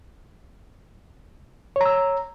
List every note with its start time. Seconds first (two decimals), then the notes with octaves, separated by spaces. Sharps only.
1.76 C#5
1.81 A#5
1.86 E6